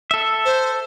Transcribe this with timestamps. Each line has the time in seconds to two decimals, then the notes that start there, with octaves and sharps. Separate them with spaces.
0.11 A4 E5
0.45 C5